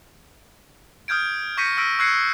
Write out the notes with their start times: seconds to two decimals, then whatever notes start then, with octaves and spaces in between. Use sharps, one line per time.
1.08 D#6 F6 G6 G#6 D7
1.57 C#6 G6 A#6 B6 C#7 D#7
1.77 C#6 E6 F6 A#6 B6 D7
1.99 C#6 E6 F#6 G#6 C7 C#7